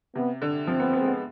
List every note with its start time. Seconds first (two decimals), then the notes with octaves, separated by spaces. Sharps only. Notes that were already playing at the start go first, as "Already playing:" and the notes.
0.15 C3 B3
0.42 D3
0.67 F3 C4
0.80 B3
0.93 B3
1.00 G#3
1.06 B3